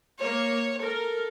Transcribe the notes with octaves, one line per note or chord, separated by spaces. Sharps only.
A#3 C#5
A4 A#4